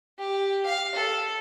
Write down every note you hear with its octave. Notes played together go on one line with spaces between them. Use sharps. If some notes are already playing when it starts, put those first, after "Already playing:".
G4
F5
A4